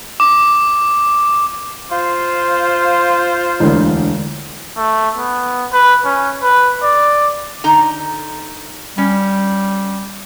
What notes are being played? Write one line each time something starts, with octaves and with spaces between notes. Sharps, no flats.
D6
F4 C5
E1 D2
A3
B3
B4
C#4
B4
D5
D3 D#4 A#5
G3 C#4